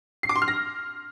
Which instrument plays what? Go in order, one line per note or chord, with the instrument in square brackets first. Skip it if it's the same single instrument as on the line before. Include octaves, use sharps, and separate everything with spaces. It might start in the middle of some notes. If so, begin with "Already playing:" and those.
[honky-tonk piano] C7
D6
C6
F6
A#6